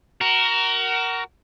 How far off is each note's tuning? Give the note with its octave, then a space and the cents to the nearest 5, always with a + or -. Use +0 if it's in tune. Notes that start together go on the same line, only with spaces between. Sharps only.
F#4 +30 A#4 +0